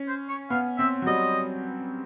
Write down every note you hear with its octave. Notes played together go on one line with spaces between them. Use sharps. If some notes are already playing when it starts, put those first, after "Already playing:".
Already playing: C#4
C5
C#5
B3 F5
C4 E5
F#3
G3 D#5